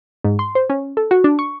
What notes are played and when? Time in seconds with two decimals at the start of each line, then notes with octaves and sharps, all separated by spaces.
0.24 G#2
0.39 C6
0.55 C5
0.70 C#4
0.97 A4
1.11 F#4
1.24 D4
1.39 C#6